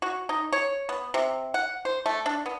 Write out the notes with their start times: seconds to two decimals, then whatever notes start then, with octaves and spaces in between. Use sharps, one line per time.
0.02 F#4
0.29 D#4
0.53 C#5
0.89 B3
1.14 C3
1.54 F#5
1.85 C5
2.06 A3
2.26 D4
2.46 B3